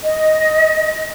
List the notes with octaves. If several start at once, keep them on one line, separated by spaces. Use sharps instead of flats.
D#5